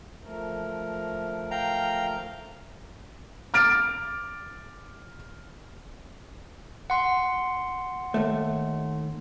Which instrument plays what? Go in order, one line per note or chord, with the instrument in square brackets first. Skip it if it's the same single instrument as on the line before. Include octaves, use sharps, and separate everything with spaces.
[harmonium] F3 A3 A#4
[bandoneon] F5 G5 A#5
[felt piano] D6 F6 A6 D7
[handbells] F#5 C6
[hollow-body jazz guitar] D#2 A3